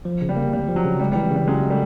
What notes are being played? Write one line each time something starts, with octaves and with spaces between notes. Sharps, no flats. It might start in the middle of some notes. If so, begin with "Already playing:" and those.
F3
C#3
G3
A#3
D2 G3
F3
F#3
C#3
G3 G#3
G3
E3
C#3 G3
C#3 F#3 G#3
G#3
G3 A3